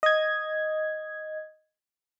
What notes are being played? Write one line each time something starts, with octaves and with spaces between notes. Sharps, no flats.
D#5 G#6